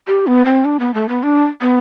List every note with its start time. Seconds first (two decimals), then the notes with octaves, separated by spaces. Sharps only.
0.07 G4
0.27 B3
0.45 C4
0.65 D4
0.80 B3
0.94 A3
1.09 B3
1.23 D4
1.62 B3